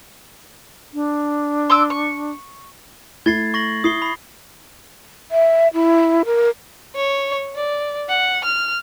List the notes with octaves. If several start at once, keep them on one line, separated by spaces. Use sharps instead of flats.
D4
C6 D6 E6
C#6
A3 E4 G#6 A6 C7 G7
C#6 A#6 F#7
E4 D#6 C7 G7
B5 C7
E5
E4
A#4
C#5
D5
F#5
F6